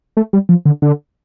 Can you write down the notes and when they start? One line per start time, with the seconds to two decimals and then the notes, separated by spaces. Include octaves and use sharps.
0.17 A3
0.33 G3
0.49 F3
0.65 D3
0.82 D3